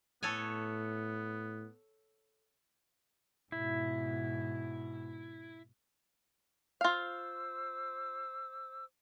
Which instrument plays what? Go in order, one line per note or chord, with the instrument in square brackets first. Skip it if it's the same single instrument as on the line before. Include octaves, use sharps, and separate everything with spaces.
[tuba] A2 [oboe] B3 [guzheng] A4 C#5 G#5
[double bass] G#2 B2 [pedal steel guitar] E4
[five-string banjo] F4 F5 [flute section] C5 D6 E6